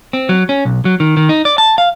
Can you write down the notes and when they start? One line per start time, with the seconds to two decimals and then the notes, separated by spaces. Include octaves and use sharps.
0.13 C4
0.29 F#3
0.49 C#4
0.65 B1
0.85 F#3
1.00 D#3
1.17 D#3
1.29 D#4
1.45 D5
1.58 A5
1.78 F5